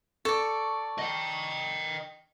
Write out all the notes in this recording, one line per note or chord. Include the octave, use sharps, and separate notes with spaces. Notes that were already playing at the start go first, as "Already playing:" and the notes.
A4 D5 C#6
D#5 G5